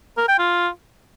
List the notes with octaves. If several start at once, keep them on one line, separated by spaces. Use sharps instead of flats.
A#4
G5
F4